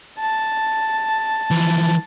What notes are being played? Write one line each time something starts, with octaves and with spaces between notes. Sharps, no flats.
A5
E3 F3